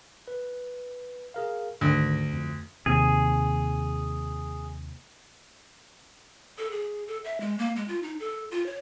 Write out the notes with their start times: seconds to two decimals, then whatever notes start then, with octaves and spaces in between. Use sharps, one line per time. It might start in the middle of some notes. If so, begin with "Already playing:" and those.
0.28 B4
1.34 G#4 A#4 F5
1.81 D2 G#2 D#3
2.33 F2
2.86 D#2 C3 G#4
6.58 A4
6.71 G#4
7.08 A4
7.24 E5
7.40 G#3
7.59 A#3
7.76 G#3
7.88 F4
8.03 D#4
8.20 A4
8.51 F4
8.66 C#5